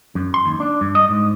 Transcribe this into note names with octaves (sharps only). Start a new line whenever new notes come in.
F#2
C6
D#2
D4
G2
D#5
G#2